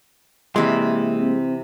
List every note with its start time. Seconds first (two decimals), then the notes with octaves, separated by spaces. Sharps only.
0.56 C3 E3 G#3 A#3 C6
1.17 C4